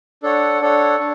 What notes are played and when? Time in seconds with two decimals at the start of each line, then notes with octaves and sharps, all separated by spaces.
0.23 D4 A4 C#5 F#5
0.61 D4 A4 C#5 F#5
0.99 D4